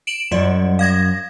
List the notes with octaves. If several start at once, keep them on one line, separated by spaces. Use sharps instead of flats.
D7 E7 F#7
F#2 G3 D5 D#5
F5 G#6 A#6